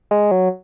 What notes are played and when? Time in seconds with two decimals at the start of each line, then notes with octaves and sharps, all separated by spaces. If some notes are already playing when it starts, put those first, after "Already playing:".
0.11 G#3
0.31 F#3